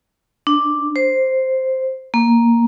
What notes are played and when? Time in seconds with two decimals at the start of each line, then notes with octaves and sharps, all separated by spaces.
0.47 D4
0.96 C5
2.14 A#3